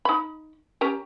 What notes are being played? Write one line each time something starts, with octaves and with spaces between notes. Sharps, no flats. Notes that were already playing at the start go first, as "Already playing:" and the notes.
D#4 B5
C#4 G4 A#4